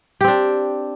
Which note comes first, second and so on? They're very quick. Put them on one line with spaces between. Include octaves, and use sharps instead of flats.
G4 C4 D4